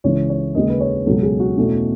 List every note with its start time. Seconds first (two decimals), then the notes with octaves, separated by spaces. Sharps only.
0.04 C#2 C#3 E3 C#5
0.30 C#5
0.55 D#2 C#3 G#3 D#5
0.69 B4
0.80 C#5
1.06 C#2 B2 F#3 C#4 A4
1.23 G#4
1.40 F#4
1.57 E2 B2 A3 C#4